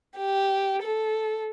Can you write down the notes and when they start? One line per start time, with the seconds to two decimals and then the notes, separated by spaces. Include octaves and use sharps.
0.18 G4
0.82 A4